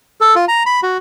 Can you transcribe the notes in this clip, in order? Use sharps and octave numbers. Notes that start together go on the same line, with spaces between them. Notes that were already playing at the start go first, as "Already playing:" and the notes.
A4
F4
A#5
B5
F#4